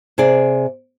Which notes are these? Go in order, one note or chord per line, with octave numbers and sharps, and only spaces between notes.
C3 G#4 D5